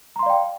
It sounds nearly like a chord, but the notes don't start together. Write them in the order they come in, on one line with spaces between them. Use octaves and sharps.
A#5 C6 F5 D5 G5